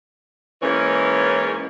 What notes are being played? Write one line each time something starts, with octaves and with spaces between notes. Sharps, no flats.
G#2 E3 A#3 C#4 C#5